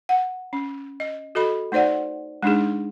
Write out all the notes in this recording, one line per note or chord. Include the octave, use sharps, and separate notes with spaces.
F#5
C#4
D#5
F#4 A4 D#5 B5
A3 D#4 C5 D5 F#5
G#3 D4 D#4 G#4